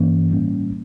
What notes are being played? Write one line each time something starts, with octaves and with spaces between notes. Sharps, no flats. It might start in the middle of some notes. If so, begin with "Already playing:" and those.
Already playing: G2 E3 A#3 C#4
A2 G3 A#3 C#4